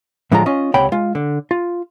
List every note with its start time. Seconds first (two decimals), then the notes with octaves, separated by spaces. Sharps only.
0.32 A2 D3 F3 G#3 F4 A#5
0.46 C#4 F4 D#5
0.74 C#2 C3 C#5 F#5 G5 B5
0.92 G#3 F4
1.15 D3
1.51 F4